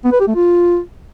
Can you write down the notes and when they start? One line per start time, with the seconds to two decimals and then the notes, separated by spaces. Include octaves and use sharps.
0.05 B3
0.12 B4
0.20 G4
0.28 A3
0.36 F4